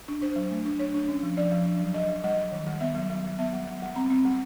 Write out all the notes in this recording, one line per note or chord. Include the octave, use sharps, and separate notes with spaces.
D4
D4 C5
F#3
A3
D4
D4 C#5
D4
C#4
F3
F3 D5
F3
D4
F#3
F#3 D#5
F#3
G3 D#5
G3
D#3
G3
B3 E5
F#3
F#3
F#3
B3 E5
G3
G3
G3
C4 A#5
C4
G3